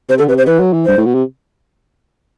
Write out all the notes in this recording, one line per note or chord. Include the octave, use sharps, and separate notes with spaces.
C3 C5
D3 A4
C3 B4
C5
E3 B4
F#3
E3
G2 C5
A2
B2
C3